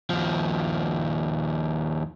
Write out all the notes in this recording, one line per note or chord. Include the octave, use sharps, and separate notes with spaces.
D#2 F3